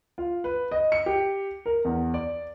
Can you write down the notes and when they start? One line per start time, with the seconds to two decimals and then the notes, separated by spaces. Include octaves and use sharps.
0.18 F4
0.44 B4
0.71 D#5
0.92 C#7
1.06 G4
1.66 A#4
1.85 E2
2.14 D5